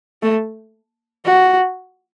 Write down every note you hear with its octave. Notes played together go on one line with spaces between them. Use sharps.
A3
F#4